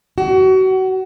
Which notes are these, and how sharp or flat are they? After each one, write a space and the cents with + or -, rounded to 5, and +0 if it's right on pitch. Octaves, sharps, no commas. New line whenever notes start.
F#4 +30